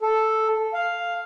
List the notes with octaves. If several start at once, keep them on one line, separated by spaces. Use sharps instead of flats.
A4
F5